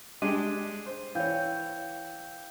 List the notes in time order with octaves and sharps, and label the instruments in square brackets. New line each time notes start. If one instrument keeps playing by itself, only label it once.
[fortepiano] G#3 D4 G4 [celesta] D#7
[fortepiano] C5
[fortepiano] E3 C#5 [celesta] F5 G5 G6